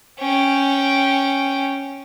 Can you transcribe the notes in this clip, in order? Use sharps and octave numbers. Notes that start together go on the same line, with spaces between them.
C#4 G5